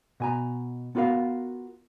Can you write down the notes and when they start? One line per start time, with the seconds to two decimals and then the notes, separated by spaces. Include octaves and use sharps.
0.20 B2 G#5 A#5
0.95 B3 F4 F#4 A#4 F5